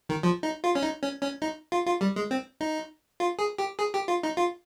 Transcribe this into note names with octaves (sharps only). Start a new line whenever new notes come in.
D#3
F3
D#4
F4
C#4
D#4
C#4
C#4
D#4
F4
F4
G3
G#3
C4
D#4
F4
G#4
G4
G#4
G4
F4
D#4
F4